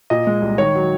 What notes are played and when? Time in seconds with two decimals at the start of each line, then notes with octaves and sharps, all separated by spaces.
0.10 A#2 D#5
0.27 G#3
0.42 C2
0.58 D#3 C#5
0.75 F#3